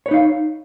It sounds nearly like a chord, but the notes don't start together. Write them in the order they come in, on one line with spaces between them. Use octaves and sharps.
C#5 B4 D#4 F5